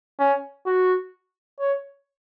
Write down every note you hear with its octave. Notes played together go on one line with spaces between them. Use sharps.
C#4
F#4
C#5